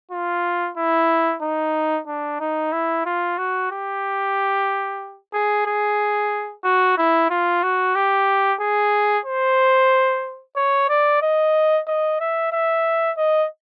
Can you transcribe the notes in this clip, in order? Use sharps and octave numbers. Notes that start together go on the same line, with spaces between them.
F4
E4
D#4
D4
D#4
E4
F4
F#4
G4
G#4
G#4
F#4
E4
F4
F#4
G4
G#4
C5
C#5
D5
D#5
D#5
E5
E5
D#5